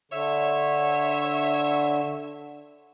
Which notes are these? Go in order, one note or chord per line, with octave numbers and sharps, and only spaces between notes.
D3 C#5 E5